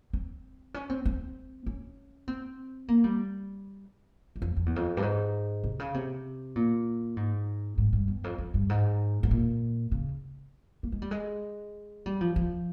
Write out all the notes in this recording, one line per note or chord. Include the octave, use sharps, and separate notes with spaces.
C4
C#4
C4
C4
C#4
C4
A#3
G3
G2
F2
F2
E2
F2
G2
G#2
C3
C#3
C3
A#2
G#2
G#2
G2
E2
F2
F2
G2
G#2
G#2
A#2
C#3
A#3
G#3
G3
G#3
G3
F3
F3